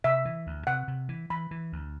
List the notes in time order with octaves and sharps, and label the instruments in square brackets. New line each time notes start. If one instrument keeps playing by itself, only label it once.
[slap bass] C3 [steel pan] E5
[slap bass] E3
D2
[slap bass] C3 [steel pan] F#5
[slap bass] C3
E3
[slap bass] E3 [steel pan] B5
[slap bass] E3
D2